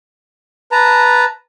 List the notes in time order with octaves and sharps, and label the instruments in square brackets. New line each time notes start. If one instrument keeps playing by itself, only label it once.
[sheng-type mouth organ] B4 A5 A#5